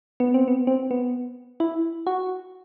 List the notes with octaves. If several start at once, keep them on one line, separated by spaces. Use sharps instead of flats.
B3
C4
B3
C4
B3
E4
F#4